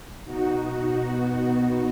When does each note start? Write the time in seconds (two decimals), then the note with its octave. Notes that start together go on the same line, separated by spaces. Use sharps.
0.24 B2 D#4 F#4
1.03 B3 D#4